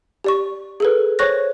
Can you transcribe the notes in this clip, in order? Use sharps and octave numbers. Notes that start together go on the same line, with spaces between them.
G4 D5 C#6
G#4 A4 B4
C5 C#5 C#6 F#6 A#6